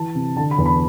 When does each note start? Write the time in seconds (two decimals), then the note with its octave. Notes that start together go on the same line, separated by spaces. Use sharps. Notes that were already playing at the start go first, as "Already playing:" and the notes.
Already playing: E3 A5
0.15 C3
0.37 D3 A5
0.51 B5
0.58 E2
0.66 B5